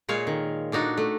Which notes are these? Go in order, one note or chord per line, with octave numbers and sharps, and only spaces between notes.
A#2 G#3 C#5 F5
D#3
A#2 D4 D#4 F#4
A3